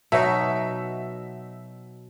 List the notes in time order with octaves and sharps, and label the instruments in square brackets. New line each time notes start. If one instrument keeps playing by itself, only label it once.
[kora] B2 F#3 D#4 [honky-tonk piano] E5